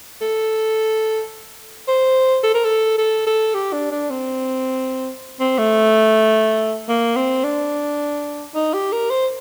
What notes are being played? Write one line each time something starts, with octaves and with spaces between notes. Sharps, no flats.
A4
C5
A4
A#4
A4
A4
A4
G4
D4
D4
C4
C4
A3
A#3
C4
D4
D#4
G4
A#4
C5